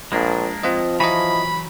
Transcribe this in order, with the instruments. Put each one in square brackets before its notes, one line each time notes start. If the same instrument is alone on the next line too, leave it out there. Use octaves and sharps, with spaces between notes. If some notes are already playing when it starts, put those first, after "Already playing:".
[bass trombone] A#1 [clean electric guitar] G#3 A#3 D4
[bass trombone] F3 [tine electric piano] C4 F4 D#5
[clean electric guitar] E3 F#3 [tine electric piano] E4 D#5 [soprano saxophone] B5